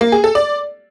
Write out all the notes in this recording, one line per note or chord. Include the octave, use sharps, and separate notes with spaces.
A#3
G#4
A4
D5